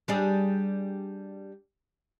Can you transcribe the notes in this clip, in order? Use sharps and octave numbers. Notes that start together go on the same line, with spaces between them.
G3 D4 G#4